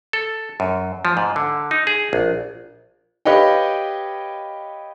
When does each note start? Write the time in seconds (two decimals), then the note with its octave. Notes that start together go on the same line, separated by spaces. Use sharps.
0.13 A4
0.60 F#2
1.05 F3
1.17 G#2
1.36 D3
1.71 D#4
1.87 G#4
2.13 A#1
3.25 G4 B4 C#5 D#5 F5 G5